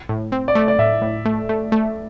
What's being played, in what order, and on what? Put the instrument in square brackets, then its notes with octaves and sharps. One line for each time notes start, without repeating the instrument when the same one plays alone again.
[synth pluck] A2
C4
[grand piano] D5
[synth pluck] A3
[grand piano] D5
[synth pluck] A2 [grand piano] E5
[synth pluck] A2
A3
A3
A3